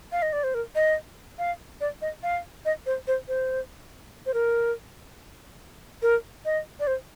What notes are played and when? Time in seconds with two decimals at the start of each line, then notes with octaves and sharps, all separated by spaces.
0.12 F5
0.22 D#5
0.33 D5
0.44 C5
0.54 A#4
0.75 D#5
1.39 F5
1.81 D5
2.02 D#5
2.23 F5
2.65 D#5
2.86 C5
3.07 C5
3.28 C5
4.26 C5
4.34 A#4
6.02 A#4
6.45 D#5
6.80 D5
6.87 C5